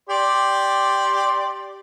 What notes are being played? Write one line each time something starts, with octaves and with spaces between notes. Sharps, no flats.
G4 D5 C6